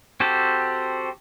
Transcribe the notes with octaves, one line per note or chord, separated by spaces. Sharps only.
C4 F#4 G4 A4